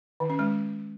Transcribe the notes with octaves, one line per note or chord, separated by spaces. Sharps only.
D#3
C#4
G#3